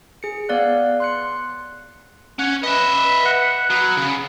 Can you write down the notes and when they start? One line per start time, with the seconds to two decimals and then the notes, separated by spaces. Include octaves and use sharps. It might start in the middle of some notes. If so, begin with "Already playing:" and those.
0.23 G#4 C#7
0.49 B3 C#5 D5 F5 F#6
1.00 C6 F#6 C#7
2.39 C#4 F#5
2.63 B4 D#5 E5
3.26 F#5
3.70 F#3 B3
3.97 C#3